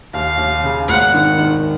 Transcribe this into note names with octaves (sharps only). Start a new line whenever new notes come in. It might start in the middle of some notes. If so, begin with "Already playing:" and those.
D#2 F5
D#2
C#3
G#1 F#5
D#3
D#3